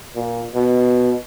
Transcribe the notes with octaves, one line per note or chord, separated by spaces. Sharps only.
A#2
B2